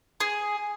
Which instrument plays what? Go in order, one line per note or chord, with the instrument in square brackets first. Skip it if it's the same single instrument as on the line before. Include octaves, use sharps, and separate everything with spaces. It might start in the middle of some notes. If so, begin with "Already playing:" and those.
[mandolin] G#4